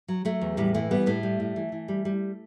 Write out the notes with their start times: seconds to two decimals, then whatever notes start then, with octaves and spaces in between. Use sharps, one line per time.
0.08 F#3
0.25 F#3 A3
0.41 E2
0.57 A2 G3
0.74 E3 A3
0.91 G3 B3
1.06 A2 A3
1.23 G3
1.40 A2
1.56 E3
1.72 E3
1.88 G3
2.05 G3